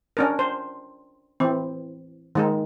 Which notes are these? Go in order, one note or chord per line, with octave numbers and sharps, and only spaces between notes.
C#4 D4 A#4
C5
E3 C4
D#3 G#3 D#4